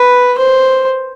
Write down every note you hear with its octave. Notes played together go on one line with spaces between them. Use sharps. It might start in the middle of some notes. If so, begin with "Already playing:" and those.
Already playing: B4
C5